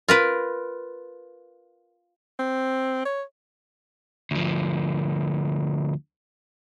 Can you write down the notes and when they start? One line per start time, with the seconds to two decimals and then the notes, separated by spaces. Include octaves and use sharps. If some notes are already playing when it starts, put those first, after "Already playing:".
0.08 F4 A#4 B4
2.39 C4
3.05 C#5
4.31 D2 F3